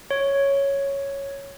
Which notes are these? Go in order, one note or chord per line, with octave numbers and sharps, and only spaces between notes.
C#5